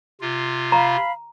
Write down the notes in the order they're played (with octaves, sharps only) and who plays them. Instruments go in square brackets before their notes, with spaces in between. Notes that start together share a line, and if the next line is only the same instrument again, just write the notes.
[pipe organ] C3 F4
[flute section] F5 B5 [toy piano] A#5